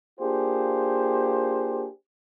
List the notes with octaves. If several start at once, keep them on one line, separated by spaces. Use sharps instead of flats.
A#3 D4 F4 G4 G#4 C5